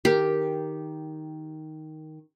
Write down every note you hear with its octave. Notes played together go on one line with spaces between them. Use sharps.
D#3 G4 A#4